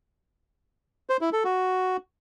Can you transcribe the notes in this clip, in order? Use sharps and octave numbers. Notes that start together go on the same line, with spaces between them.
C5
E4
A4
F#4